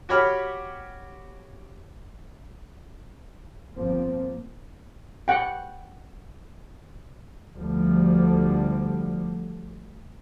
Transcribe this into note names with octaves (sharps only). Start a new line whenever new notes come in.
F#4 G4 C#5 B5 F6
G1 F3 A#3 C4
F#5 G5
D2 D3 F3 G3